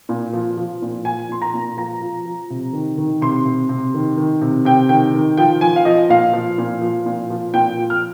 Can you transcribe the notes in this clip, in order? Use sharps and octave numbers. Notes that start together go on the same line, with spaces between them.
A#2
F3
F3
A#2
F3 G#5
A#2 C6
A#5
A#2
F3 A#5
F3
F3
C3
D#3
D#3
C3 C6
C3
C3
D#3
D#3
C3
C3 G5
D#3 G5
D#3
F3 G5
F3 G#5
F5
F3 D#5
A#2 F5
F3
A#2
F3
A#2
F3
A#2 G5
F3
F6